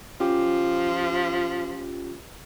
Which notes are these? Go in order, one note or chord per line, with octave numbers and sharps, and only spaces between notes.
F3 C#4 F4 G4